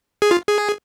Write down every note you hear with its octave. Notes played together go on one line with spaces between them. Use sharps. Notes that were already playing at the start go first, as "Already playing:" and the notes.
G#4
F4
G#4